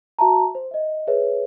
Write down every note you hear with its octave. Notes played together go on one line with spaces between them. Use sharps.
F#4 E5 A5 A#5
C5
D#5 E5
G#4 B4 C#5 E5